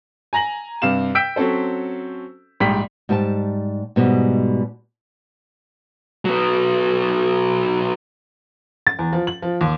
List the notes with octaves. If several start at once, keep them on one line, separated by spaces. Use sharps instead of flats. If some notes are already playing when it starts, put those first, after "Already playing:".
G#5 A#5 A#6 F#7
G2 C3 F5 E7
G5 E6 G6 B6 D7
F#3 C4 C#4 A4 C5
A#1 G#2 G3 G5 B6
G#2 G3 G4 G#5 A5
G#2 B2 G3 G#3
F#3 B3
A6
E2
F3
F#7
F3
D#2